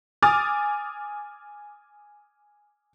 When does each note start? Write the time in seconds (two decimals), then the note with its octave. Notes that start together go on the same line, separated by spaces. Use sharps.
0.22 G#5 D6 D#6 F6 A6